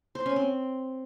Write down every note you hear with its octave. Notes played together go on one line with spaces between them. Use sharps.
C5
C#4
C4